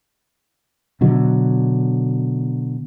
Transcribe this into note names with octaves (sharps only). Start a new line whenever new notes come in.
B2 D3 F#3